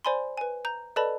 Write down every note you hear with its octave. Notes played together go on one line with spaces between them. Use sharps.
C5 D5 G#5 B5 C6
B4 G#5
A#5 G6
A4 B4 D5 D#5 A5 B5